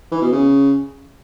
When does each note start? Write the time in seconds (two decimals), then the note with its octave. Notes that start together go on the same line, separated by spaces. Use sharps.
0.12 E3
0.22 B2
0.32 C#3